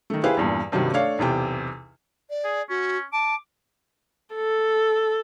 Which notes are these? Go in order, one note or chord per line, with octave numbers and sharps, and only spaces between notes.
D#3 A3
E4 G4 G#4 B4 C5 F5
E2 G2 A#2
G2 C3 D#3 F#3 G3
A3 D4 C#5 F5
B1 E2 C3 G5
D5
G#4
C#4 F#4
A5 D6
A4